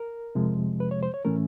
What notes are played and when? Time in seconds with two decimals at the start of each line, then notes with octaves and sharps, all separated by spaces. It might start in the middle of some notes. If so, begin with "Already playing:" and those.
Already playing: A#4
0.35 F2 C3 F3 G#3
0.80 B4
0.91 C#5
1.03 C5
1.14 C#5
1.24 A2 E3 A3 C#4 A#4